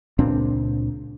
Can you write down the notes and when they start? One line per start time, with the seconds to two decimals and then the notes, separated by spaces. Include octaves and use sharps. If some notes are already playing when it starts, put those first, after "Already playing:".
0.19 C#2 A#2 C4 D4